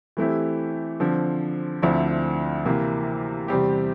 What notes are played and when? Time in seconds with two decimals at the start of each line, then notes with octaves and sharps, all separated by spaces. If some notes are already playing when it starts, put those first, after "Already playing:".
0.17 E3 A3 C4 E4 G4
1.00 D3 F3 C4
1.82 D2 D3 F3 C4 E4
2.65 C3 E3 A#3
3.48 E2 C3 G3 C4 G4